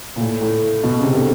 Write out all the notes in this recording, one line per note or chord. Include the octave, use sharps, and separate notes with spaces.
A#2
A2
A2
B2
C#3
C3
D3